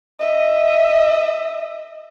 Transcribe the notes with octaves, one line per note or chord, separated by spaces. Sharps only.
D#5 E5